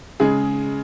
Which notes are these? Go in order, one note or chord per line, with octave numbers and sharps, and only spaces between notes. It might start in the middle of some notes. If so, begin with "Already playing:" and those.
C#3 G#3 G#4